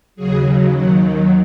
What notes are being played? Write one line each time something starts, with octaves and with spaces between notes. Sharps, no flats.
D#2 C#3 F#3 G#4
D#2 D#3 F#3 F#4